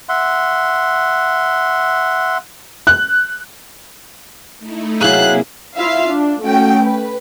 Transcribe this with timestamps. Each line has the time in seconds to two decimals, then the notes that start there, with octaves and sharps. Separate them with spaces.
0.09 E5 F#5 C6
2.87 F#6
4.59 A3 D#4 E4
5.01 C3 F#3 A#3 E4 G#4 F5 F#6
5.76 E4 F4 E5 F5
6.08 D4
6.41 A3 C#4 F#4 G5
6.82 B4